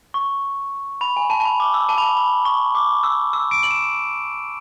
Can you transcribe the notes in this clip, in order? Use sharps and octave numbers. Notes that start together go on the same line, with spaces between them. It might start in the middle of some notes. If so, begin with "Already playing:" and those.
C#6
B5
G#5
A5
A5
B5
D6
E6
A5
B5
A5
B5
C#6
D6
E6
E6
D7
F#7
E7